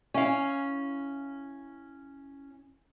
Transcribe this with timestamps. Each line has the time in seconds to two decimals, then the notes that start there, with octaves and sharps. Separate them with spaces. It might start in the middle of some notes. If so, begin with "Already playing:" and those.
0.14 C#4 E4 F5